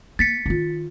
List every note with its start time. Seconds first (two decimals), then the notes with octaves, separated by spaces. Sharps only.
0.19 A#3 A6 B6 C#7
0.46 D#3 F4